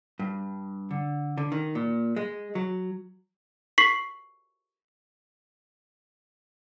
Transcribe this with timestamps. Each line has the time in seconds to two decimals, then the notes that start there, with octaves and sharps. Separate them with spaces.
0.19 G2
0.91 D3
1.38 D3
1.52 D#3
1.75 A#2
2.16 G#3
2.55 F#3
3.78 C#6 B6 C7 F#7